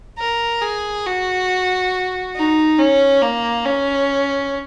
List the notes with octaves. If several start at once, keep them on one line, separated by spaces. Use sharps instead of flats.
A#4
G#4
F#4
D#4
C#4
A#3
C#4